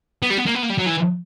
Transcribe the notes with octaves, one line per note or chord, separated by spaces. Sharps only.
B3
G3
B3
A#3
B3
A#3
G3
F#3
E3